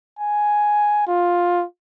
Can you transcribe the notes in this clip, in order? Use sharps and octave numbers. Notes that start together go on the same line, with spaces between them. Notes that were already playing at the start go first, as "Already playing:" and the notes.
G#5
F4